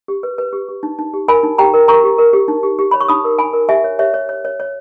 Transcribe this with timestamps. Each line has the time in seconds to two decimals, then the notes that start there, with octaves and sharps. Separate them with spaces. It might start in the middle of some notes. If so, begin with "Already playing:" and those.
0.08 G4
0.23 B4
0.38 B4
0.53 G4
0.68 G4
0.83 D#4
0.99 D#4
1.14 G4
1.28 A#4 G#5 B5
1.43 D#4
1.58 G4 G5 A#5
1.73 A#4
1.88 A#4 A#5 C#6
2.04 G4
2.18 A#4
2.33 G4
2.48 D#4
2.63 G4
2.79 G4
2.91 C#5 B5
3.01 C#6
3.08 D#4 B5 D#6
3.24 A#4
3.39 D#4 G#5 B5
3.53 A#4
3.69 G4 E5 G#5
3.84 C#5
3.99 G4 C#5 E5
4.14 C#5
4.29 C#5
4.45 C#5
4.60 C#5